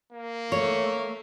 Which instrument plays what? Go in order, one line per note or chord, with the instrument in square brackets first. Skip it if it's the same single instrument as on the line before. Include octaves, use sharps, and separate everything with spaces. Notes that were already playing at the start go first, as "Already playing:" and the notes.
[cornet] A#3
[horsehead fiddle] A3 [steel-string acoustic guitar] C#5